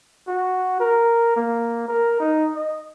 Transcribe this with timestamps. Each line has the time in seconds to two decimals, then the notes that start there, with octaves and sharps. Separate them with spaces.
0.28 F#4
0.80 A#4
1.36 A#3
1.88 A#4
2.20 D#4
2.55 D#5